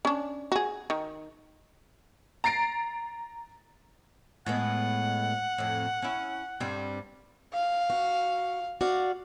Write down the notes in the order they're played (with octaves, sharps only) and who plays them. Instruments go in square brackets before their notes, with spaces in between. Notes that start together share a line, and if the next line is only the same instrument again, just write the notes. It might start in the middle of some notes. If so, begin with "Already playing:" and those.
[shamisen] C#4 D4
F#4 G#4
D#3
[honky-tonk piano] A#5 A6 C7 D7
[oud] A2 G#3 B3 [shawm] F#5
[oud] F2 A2
C#4 E4
G2 G3 C4
[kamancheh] F5
[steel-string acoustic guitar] F#4
F#4 D5 F5